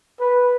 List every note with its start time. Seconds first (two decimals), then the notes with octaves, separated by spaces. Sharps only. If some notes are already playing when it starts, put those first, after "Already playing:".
0.20 B4